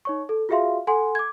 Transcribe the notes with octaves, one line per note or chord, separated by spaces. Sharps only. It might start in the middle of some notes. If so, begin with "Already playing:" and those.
D#4 C#5 C#6
A4
F4 F#4 G#4 E5 F5 C6
A4 F#5 G#5 C6
D6 G#6